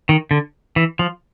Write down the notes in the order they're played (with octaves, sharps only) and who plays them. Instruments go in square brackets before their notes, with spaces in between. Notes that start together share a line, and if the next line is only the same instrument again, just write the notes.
[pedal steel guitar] D#3
D3
E3
F3